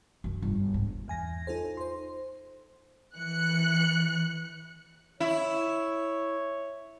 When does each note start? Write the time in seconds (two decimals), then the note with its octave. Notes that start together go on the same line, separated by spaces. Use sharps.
0.24 F#2
0.42 G1
0.74 G#2
1.08 E2 G#5 A#6
1.47 D#4 F4 A4 C5
1.77 C5 C6
3.14 E3 F#6 C#7
5.20 E4 C#5